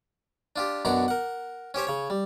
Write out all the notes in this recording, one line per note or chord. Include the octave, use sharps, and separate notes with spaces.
D4 F4 G4
F#2 B2 D4 F#5 A#5
A#4 F#5
C#4 G4 C5 C#5
C#3 C#5
G3